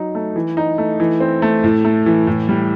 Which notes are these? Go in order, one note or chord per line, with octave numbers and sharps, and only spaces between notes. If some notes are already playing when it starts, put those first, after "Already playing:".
Already playing: F#3 D#4
A3
E3
D#4
A3
E3
C4
A3
A2
A3
E3
A2
G3